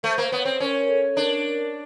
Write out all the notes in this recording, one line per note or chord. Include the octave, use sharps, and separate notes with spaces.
A3 C5
A#3 C5
B3 C#5
C4 C5
C#4 A#4
A#4
A4
D4 A#4